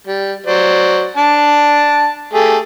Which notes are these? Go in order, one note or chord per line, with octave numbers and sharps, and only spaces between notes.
G3
F#3 C5 D5
D4 A5
A3 G4 G#4